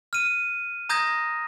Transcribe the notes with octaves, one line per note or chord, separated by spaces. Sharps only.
F6 D#7
A#5 D#6 G6 G#6 A#6